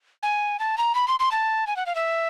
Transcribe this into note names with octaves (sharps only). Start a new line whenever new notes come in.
G#5
A5
A#5
B5
C6
C6
A5
G#5
F#5
F5
E5